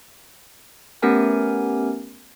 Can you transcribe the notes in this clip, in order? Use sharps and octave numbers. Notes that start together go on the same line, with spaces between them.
A3 B3 C#4 G4 A#4 G#5